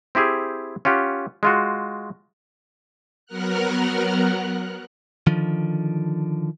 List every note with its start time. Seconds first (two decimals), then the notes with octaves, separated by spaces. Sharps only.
0.15 C4 E4 G4 G#4
0.85 C#4 F4 G4 F#5
1.43 G#3 F4 F#4
3.26 F#3 B3 A#4 F#5 F6 F#6
5.27 D3 D#3 F3